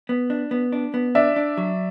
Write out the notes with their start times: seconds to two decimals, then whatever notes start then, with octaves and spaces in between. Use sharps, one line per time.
0.09 B3
0.30 D4
0.51 B3
0.72 D4
0.94 B3
1.15 D4 D5 E5
1.36 D4
1.57 F#3